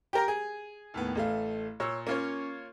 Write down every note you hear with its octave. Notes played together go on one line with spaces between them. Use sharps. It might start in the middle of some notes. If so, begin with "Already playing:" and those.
G4 A#4 A#5
G#4
D#2 A2 B3
A1 A3 F5
A#2 C#5 E6
A#3 C#4 F4 C#5